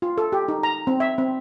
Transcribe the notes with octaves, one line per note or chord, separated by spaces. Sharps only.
F4
A4
G4
D#4
A#5
C4
E5
C4